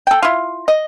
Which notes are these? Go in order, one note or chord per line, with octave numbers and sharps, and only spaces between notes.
A4 G5
E4 F4
D#5